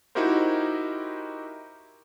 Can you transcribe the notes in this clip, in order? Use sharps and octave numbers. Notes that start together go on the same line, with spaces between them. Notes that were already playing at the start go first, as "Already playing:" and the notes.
D#4 E4 F#4 G4 A#4 C5